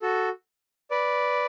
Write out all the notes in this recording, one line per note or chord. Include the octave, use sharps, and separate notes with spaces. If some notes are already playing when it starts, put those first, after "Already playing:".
F#4 A4
B4 D5